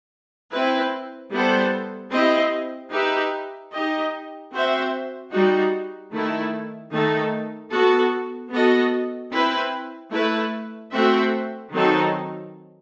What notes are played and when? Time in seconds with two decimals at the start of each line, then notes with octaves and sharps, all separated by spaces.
0.52 C4 E4 B4
1.32 G3 B3 E4 A4 C5
2.11 C4 E4 G4 D#5
2.92 D#4 G4 B4 E5
3.73 D#4 G4 D#5
4.52 C4 F#4 C5 E5
5.32 G3 D#4 F#4
6.12 D#3 A3 E4
6.92 D#3 A3 D#4 A4
7.72 B3 F#4 A4
8.51 B3 F#4 A4 D#5
9.31 C4 E4 B4
10.12 A3 E4 B4
10.92 A3 C4 F#4 C5 E5
11.71 D#3 F#3 C4 D#4 A4